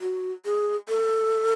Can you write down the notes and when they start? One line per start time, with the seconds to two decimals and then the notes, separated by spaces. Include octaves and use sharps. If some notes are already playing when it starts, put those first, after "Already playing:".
0.01 F#4
0.45 G#4
0.89 A4